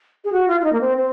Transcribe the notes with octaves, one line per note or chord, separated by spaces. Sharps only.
G#4
F#4
F4
F4
D#4
A#3
C4
C4